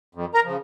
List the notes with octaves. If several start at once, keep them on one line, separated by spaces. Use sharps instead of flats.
F2
A#4 A#5
C#3 F3